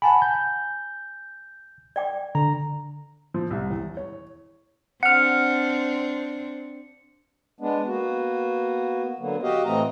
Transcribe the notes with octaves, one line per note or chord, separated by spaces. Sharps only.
F#5 G#5 A5 B5
G6
D5 G5 D6
D3 A#5
F3
C2
E2
C#5
C4 D4 F#5 F6 C#7
G#3 B3 D4
A#3 B3 F#4
D3 F#3 A#3 B3
F#4 G4 D#5 F5
A2 E3 A3 C4 D#5 A#5